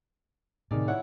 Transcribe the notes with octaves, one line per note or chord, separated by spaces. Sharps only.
A2 C3 D#3 G#4 D5
E4 C#5 F#5